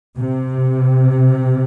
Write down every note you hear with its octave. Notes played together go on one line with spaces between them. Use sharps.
C3